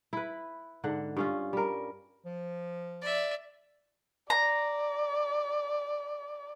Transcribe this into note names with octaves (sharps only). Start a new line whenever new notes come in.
E4 B4
G#2 D3 F#5
G2 C#4 F4
G3 A#4
F3
D5 E5
D5 A#5